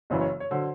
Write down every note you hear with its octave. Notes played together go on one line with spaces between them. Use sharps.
F#1 F#2 C#3 E3 C5
C#5
C#5
D3 F#3 C5